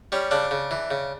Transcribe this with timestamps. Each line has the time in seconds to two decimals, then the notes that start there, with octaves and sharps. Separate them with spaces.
0.12 G3 C#4
0.31 C#3 D4
0.51 C#3
0.71 E3
0.91 C#3